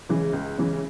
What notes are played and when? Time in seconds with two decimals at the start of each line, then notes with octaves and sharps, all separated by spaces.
0.09 C#3 E3 G#3
0.33 C#2
0.58 C#3 E3 G#3